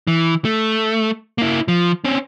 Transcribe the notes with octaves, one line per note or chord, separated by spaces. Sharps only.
E3
A3
A#3 E4
F3
C4 C#4